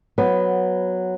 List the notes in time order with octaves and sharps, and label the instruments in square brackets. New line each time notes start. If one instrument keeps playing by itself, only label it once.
[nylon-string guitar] F#3 B3